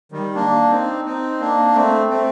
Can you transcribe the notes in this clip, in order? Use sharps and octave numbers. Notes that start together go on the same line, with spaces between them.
D#3 G3
A#3 D4
C4 D#4
C4 D#4
A#3 D4
A3 C4
A3 C4